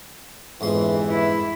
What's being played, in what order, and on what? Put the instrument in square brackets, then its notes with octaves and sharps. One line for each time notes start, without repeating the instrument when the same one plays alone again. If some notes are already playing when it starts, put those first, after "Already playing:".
[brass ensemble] G1 E3 [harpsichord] F2 G#2 C6
[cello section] E4